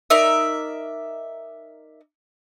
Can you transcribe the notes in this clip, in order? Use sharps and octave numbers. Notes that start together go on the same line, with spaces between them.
D#4 A#4 D5 E5